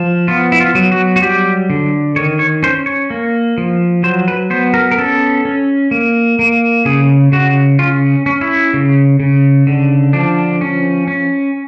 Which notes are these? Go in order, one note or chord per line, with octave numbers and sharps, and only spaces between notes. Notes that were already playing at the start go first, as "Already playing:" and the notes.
Already playing: F3
B3 F4
E4
F4
F#3
F#4
F#4
G3 G4
D3
D#3 C#5
C#5
C#4 C5
C#5
A#3
F3
F#3 C5
B4
B3 C5
A#4
A#4
C#4 A4
C#4
A#3
A#3
C#3 G#4
C#3 F#4
C#4 F4
C#4
E4
C#3
C#3
D3
F3 D4
C#4
C#4